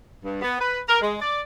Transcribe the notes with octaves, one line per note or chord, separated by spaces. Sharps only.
G2
B3
B4
A#4
G#3
D5